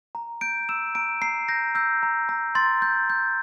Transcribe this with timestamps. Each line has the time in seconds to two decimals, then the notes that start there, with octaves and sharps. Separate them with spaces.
0.15 A#5
0.41 G6 D7
0.69 E6 E7
0.95 A#5 D7
1.22 A#5 C7
1.48 G6 A#6
1.75 E6 G6
2.03 A#5
2.29 A#5
2.55 C6 A6
2.82 G6
3.10 G6